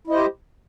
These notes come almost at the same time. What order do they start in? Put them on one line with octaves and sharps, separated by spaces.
E4 D#5 C5 G4